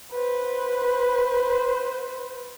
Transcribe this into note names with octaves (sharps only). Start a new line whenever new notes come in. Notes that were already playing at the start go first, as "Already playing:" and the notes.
B4 C5